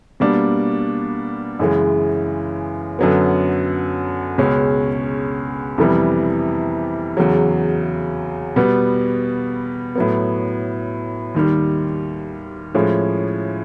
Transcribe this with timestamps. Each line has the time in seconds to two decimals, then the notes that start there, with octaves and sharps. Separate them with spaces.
0.20 B2 G3 A#3 D4
1.59 F#2 C#3 E3 G#3
2.99 F#2 D3 F#3 B3
4.38 C#2 B2 G#3 C#4
5.78 F2 C3 E3 G3 B3
7.17 E2 C#3 F#3
8.56 B2 G3 B3
9.95 A2 F#3 B3
11.35 D#2 D#3 G3
12.74 A2 F3 G#3 C#4